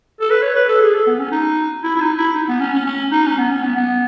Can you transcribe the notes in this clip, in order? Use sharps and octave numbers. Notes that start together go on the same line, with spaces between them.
A4
B4
C#5
B4
A4
G#4
A4
B3
C#4
D#4
E4
E4
D#4
E4
D#4
B3
C#4
C#4
C#4
D#4
C#4
B3
C#4
B3
B3